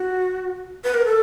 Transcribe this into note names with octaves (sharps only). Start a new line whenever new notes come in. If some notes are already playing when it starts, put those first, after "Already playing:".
Already playing: F#4
B4
A#4
A4